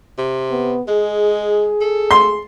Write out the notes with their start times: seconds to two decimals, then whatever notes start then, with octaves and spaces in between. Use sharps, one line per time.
0.18 C3
0.51 B3
0.88 G#3 G#4
1.81 A4
2.11 C6